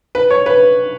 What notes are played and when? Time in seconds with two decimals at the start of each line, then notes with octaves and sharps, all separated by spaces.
0.15 B4
0.31 C#5
0.46 B4